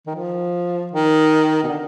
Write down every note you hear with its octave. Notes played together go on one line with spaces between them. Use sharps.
D#3
F3
D#3
B2
D3